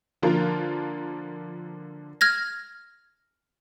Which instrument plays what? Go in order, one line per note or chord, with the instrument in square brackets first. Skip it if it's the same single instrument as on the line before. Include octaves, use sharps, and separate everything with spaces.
[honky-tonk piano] D3 F3 A#3 F4 A#4
[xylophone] F6 G#6 A#6